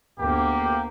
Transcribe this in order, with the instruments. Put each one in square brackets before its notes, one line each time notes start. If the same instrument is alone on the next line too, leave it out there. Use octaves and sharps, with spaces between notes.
[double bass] D2 B3 [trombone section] A#3 [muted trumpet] G4